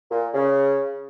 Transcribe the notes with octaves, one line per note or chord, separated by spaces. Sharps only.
A#2
C#3